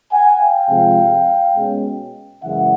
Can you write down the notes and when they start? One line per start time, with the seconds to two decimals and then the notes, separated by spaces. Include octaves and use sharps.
0.12 F#5 G#5
0.41 F5 G5
0.69 C3 F3 G#3
1.56 B2 G#3 C#4
2.43 F#2 C#3 E3 G#3 E5 F#5